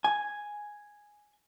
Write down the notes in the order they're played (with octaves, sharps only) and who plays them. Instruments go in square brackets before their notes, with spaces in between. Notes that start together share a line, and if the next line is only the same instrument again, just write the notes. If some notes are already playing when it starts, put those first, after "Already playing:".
[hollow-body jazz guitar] G#5